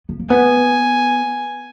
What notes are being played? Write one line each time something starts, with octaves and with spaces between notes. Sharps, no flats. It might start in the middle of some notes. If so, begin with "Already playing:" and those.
B3
A#3
B3 G#5